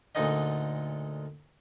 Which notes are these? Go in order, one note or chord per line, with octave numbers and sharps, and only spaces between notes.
D2 A#2 D3 D#4 D#5